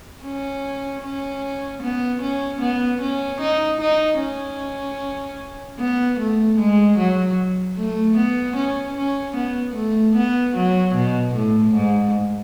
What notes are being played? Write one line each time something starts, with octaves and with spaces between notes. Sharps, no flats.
C#4
C#4
B3
C#4
B3
C#4
D#4
D#4
C#4
B3
A3
G#3
F#3
A3
B3
C#4
C#4
B3
A3
B3
F#3
B2
A2
G#2